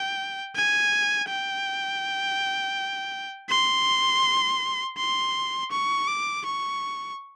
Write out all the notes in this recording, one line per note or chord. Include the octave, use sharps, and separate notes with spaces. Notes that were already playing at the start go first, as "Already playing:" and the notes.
Already playing: G5
G#5
G5
C6
C6
C#6
D6
C#6